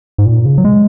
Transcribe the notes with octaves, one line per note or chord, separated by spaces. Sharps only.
G#2
A#2
C#3
F#3
G#3